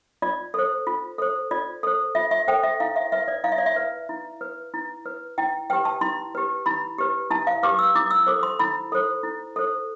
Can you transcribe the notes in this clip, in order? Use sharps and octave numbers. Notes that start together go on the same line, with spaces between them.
F4 D5
A4 C5
F4
A4 C5
F4 D5
A4 C5
F4 E5
E5
A4 C5 G5
E5
E4 F5
E5
B4 E5
D5
E4 F5
E5
D5
E5
B4
E4
B4
E4
B4
E4 G5
G4 B4 G5
A5
E4 C6
G4 B4
E4 B5
G4 B4
E4 A5
F5
G4 B4 D6
E6
E4 D6
E6
A4 C5 D6
C6
E4 B5
A4 C5
E4
A4 C5